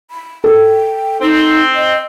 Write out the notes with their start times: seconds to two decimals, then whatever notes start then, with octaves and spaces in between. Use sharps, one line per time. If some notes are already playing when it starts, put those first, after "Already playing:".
0.11 B5
0.44 A4 G5
1.22 C4 D#4
1.74 D#5